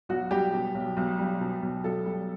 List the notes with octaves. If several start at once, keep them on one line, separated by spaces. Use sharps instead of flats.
B1 F#4
G3 G4
B2
B1
B1
G3
B2
B1
B1 A4
G3